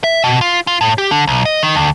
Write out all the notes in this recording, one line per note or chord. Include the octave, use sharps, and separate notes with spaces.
E5
B2
F4
F4
A2
G4
D3
B1
D#5
D#3
D2